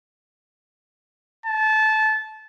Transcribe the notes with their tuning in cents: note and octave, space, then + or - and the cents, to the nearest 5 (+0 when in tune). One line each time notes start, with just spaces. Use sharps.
A5 -20